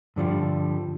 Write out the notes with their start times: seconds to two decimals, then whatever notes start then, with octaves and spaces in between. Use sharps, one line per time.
0.16 G2 D3 F3 G3